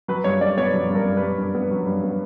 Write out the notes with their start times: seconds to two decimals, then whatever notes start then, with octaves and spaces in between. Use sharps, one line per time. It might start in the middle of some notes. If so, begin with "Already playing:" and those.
0.08 F#3 B4
0.24 G2 C#5
0.41 G2 D5
0.57 B3 C#5
0.74 F#3
0.90 G2
0.95 A#4
1.06 G2
1.17 B4
1.22 G2
1.38 G2
1.55 B3
1.71 F#3
1.87 G2
2.04 B3